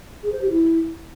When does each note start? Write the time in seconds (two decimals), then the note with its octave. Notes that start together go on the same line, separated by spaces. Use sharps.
0.23 G#4
0.32 C5
0.41 G4
0.50 E4